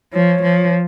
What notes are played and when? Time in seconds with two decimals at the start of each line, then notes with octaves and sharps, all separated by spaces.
0.13 F3 C#5
0.43 F3